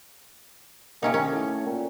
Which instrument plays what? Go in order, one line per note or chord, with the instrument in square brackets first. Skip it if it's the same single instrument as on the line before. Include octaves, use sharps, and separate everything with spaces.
[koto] C3 C#4 D#4 [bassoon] A#3
[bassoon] D#3 [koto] C#4
[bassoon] A2
A#2